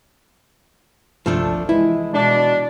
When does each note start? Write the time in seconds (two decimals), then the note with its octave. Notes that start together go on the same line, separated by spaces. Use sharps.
1.26 G1 C2 F3 A3 D4 A4
1.69 E3 G#3 E4
2.14 B2 D4